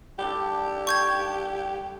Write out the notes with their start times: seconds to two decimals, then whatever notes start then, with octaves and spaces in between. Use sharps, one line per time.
0.19 G3 D4 G4 A4
0.87 C#6 G6 G#6